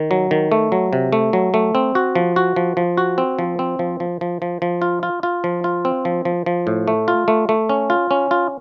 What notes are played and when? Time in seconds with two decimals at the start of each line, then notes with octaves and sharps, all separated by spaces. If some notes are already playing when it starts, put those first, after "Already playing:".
Already playing: D#3
0.11 F#3
0.31 D#3
0.52 A3
0.72 F#3
0.93 C3
1.13 A3
1.33 F#3
1.54 A3
1.75 C4
1.95 F#4
2.15 F3
2.36 F#4
2.56 F3
2.77 F3
2.98 F#4
3.18 C4
3.39 F3
3.59 C4
3.79 F3
4.00 F3
4.21 F3
4.42 F3
4.62 F3
4.82 F4
5.03 F4
5.23 F4
5.44 F3
5.64 F4
5.85 C4
6.05 F3
6.25 F3
6.46 F3
6.67 A2
6.88 A3
7.08 F4
7.28 A3
7.49 A3
7.69 C#4
7.90 F4
8.11 C#4
8.31 F4